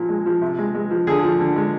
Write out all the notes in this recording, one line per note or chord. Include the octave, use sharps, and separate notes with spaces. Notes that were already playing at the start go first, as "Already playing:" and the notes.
Already playing: A#2 F3
G#3
F3
C3
G#3
G#3
F3
D3 G#4
F3
D3
G#3